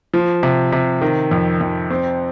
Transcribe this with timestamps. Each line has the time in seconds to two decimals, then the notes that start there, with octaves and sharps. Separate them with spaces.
0.14 F3
0.43 C3
0.72 C3
1.01 D#3
1.31 F2
1.61 F2
1.90 C4